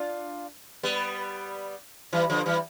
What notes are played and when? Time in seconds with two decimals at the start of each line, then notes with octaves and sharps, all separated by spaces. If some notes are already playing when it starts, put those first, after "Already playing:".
Already playing: D4 F4
0.83 G3 B3
2.13 E3 G3
2.30 D3 F3
2.46 E3 G3